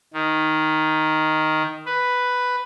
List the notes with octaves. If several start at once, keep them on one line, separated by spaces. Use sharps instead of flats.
D#3
B4